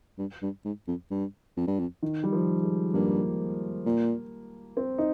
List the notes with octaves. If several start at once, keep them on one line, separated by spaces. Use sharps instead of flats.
G2
G2
G#2
F2
G2
F2
G2
F2
D#3
G3
F3
G#3
G2 A#3
A#2
C4
D#4